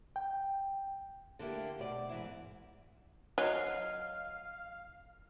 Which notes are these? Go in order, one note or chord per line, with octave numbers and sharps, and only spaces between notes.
G5
D3 A#3 E4 G4
D2 B2 C5 D5
G#2 E3 E4
F#3 D#5 F5